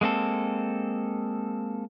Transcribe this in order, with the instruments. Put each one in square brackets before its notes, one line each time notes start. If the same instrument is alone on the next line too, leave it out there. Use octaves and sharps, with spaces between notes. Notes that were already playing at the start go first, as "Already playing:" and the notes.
[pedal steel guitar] G#3 A#3 C4 A4